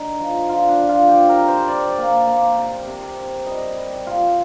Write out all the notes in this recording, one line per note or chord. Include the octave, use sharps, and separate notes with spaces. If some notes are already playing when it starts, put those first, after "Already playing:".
Already playing: D3 D#4
F3
D3 F4
D4
F3
F4
F3 G4
A#4
C3
C5
C3 D5
A#3
A#3
C3
C3
C3
G3 D#5
G3
C3 F4